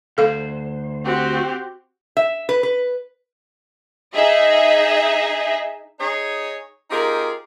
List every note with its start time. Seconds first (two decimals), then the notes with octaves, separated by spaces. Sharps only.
0.18 D2 A4 C5 F5
1.05 C4 F#4 G4
2.17 E5
2.49 B4
2.63 B4
4.15 D#4 G#4 D#5 E5
6.00 D#4 G#4 C#5
6.91 C4 D#4 F4 G4 G#4 A#4